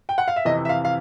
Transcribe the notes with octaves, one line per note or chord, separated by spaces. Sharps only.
G5
F#5
F5
E5
F2 C3 E3 D#5
E5
F5
F5